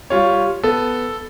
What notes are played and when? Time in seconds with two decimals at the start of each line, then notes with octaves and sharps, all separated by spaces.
0.10 G3 F4 C#5
0.63 B3 A4